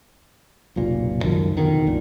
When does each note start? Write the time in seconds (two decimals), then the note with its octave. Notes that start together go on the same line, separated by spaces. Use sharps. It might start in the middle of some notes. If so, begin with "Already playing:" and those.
0.76 F1 B1 A#2
1.23 C#2 F#2 D#3 F3
1.57 F2 B2 D3 D#3
1.87 B1 F#2 A#2